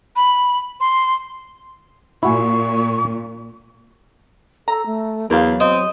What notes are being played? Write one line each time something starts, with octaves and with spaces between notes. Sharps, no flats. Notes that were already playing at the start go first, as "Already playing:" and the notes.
B5
C6
A#2 E4 F#4 G#5 C#6
A4 A#5
A3
E2 F#3 A#4 F5
C4 D#5